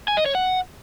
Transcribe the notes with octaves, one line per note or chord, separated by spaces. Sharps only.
G#5
D#5
C#5
F#5